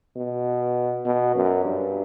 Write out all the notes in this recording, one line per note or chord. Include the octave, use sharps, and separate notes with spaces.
B2
B2
F#2
G2